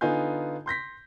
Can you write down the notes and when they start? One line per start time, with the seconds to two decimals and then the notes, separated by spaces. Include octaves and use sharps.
0.01 D3 B3 D#4 F4 G#5 G6
0.66 C6 G6 A#6 B6